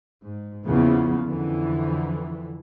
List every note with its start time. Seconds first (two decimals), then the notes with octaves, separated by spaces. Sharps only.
0.24 G#2
0.65 E2 C#3 F3 A#3 B3
1.24 F2 D3 E3